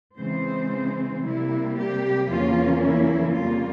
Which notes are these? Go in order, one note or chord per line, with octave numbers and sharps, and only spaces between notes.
C#3 E3 G#3 C4 C5
C3 G3 A#3 E4
G4
E2 C#3 F3 A#3 C#4 F4
E4
F2 C#3 G3 A#3 F4